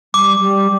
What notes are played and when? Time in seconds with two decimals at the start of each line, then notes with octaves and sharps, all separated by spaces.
0.14 G3 D6
0.40 G3